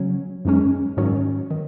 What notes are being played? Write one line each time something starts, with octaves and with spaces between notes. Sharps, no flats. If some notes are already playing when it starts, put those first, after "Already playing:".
Already playing: C#3 F#3 C#4
F#2 D#3 G#3 C#4
G#2 D#3 F#3 C#4
D#3